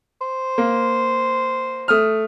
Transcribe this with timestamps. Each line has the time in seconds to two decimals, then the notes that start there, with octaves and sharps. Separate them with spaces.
0.21 C5
0.58 A#3
1.88 A3 D#6 F6